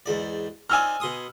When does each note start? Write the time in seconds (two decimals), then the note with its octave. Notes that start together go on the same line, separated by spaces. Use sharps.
0.06 E2 G#2 D5
0.70 C4 D#4 D5 G#5 E6 F6
1.00 B2 C6 D#6